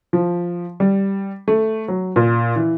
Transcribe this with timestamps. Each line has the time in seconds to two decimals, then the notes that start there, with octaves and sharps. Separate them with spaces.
0.13 F3
0.80 G3
1.48 A3
1.88 F#3
2.16 A#2
2.56 E3